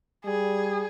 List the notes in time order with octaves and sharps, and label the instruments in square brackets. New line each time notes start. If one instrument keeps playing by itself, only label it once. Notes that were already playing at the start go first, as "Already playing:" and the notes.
[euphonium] G3 [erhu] G#4